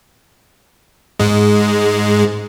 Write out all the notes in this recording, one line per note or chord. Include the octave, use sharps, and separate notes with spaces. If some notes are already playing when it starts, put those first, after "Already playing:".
G#2 G#3